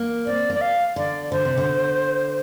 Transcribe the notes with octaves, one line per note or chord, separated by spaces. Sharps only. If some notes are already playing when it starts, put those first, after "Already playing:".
Already playing: A#3
C4 D5
A#3
D5
F5
D3 D5
D3 C5
C3
D3